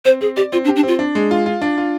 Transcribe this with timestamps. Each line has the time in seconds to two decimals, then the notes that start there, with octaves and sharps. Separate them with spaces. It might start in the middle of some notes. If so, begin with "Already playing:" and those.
0.05 C4 C5
0.21 C4 G#4
0.36 G4 D5
0.52 C4 F4
0.65 D4
0.68 G4
0.76 D4
0.83 C4 F4
0.99 D4
1.15 G#3
1.31 F4
1.46 F4
1.62 D4
1.78 F4